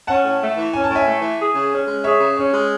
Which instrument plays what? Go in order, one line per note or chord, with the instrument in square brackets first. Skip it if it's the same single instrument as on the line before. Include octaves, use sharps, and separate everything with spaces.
[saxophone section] C#4 [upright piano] F#5 A5
[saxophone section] A2
A3
E3
[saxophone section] C#4 [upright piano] G#5
[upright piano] A5
[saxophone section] A2
[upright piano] E5 G#5
[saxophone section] A3
E3
G#4
C#3
C#4
G#3
[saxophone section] G#4 [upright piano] C#5 E5
[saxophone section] C#3
[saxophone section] C#4 [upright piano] C#5
[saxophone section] G#3